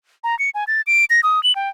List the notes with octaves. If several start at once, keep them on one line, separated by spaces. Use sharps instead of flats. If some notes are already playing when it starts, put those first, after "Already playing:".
A#5
C#7
G#5
A6
D7
A#6
D#6
F#7
G5